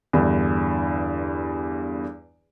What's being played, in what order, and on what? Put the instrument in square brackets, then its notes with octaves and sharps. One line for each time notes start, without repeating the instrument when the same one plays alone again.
[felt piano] E2 G2 D3